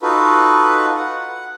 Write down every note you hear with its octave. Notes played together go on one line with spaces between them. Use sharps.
D#4 F4 F#4 A4 B4
F#5